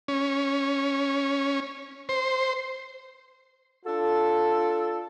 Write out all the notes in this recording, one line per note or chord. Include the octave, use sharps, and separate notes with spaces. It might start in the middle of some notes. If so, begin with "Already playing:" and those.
C#4
C5
D4 F4 A4